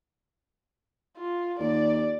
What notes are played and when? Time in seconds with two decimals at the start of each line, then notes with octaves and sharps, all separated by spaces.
1.17 F4
1.60 D#2 D5